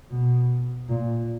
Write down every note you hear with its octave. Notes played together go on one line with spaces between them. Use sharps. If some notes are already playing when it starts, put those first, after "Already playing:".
B2
A#2